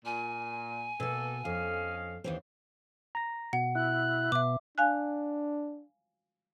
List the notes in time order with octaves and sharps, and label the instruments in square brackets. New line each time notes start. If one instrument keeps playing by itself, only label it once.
[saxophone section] A#2 [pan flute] G#5
[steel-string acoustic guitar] B2 B4 [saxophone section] A#3 A4
[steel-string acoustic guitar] F2 [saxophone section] C#4 D#5 F5
[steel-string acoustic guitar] D#2 E3 C4
[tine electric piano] A#5 A#6
[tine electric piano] B2 [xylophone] F#5
[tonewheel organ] E4 [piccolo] F#6
[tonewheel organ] B2 [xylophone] E5 D6
[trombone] D4 [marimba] F5 G#5 F#6